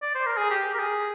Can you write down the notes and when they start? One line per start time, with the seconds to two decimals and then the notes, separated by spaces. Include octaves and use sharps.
0.02 D5
0.15 C5
0.26 A#4
0.37 G#4
0.51 G4
0.74 A#4
0.79 G#4